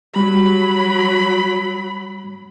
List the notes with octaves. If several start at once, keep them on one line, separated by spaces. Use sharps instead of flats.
F#3 G3 B5